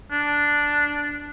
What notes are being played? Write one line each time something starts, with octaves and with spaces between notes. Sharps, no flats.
D4